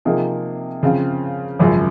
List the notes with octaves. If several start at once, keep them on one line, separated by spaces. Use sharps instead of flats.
C3 F3 A#3 D#4 G#4
C#3 F3 C4 F4
G#1 F#2 C#3 F3